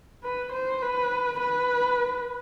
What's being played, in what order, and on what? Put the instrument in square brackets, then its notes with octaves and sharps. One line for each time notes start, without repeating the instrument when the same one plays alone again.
[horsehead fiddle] B4
C5
B4
B4